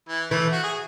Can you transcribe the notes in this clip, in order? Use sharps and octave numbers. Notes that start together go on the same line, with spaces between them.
E3
E3 A3
F#4
G#4